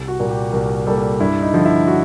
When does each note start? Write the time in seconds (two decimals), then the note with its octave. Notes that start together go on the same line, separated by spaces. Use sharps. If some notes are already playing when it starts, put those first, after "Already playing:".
Already playing: C2
0.08 F#4
0.19 A#2 G3 A#3
0.31 G4
0.52 C2 A#4
0.87 A#2 G3 A#3 A4
1.20 G2 E4
1.42 D#4
1.54 D3 F3
1.65 E4
1.87 F#4